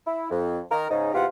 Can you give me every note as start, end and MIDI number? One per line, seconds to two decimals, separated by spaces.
0.05 0.30 64
0.30 0.60 41
0.71 0.86 51
0.71 0.86 70
0.90 1.12 44
0.90 1.12 49
0.90 1.12 63
1.14 1.26 40
1.14 1.26 48
1.14 1.26 65
1.14 1.26 67
1.14 1.26 78